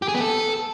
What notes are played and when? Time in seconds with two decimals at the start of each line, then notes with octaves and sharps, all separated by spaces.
0.02 G4
0.08 G#4
0.14 B3
0.21 A4